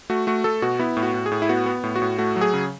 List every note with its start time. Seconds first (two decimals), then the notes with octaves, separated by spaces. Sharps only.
0.10 A3 F#4
0.27 A3 F#4
0.44 A3 A4
0.62 B2 F#4
0.79 B3 E4
0.97 A2
1.03 F#4
1.14 A2
1.26 G#4
1.32 A2
1.42 E4
1.49 B3 F#4
1.66 B3
1.84 A2
1.96 F#4
2.02 A2
2.19 A3 F#4
2.36 F#3
2.41 G#4
2.54 C#3